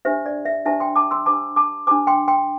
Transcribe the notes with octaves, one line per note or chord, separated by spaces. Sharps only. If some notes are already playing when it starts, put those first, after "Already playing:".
D4 G4 C5 E5
D5
E5
D4 G4 C5 E5 A5
G5 C6
A5 D6
C6 E6
D4 G4 C5 A5 D6
A5 D6
D4 G4 C5 A5 D6
G5 C6
G5 C6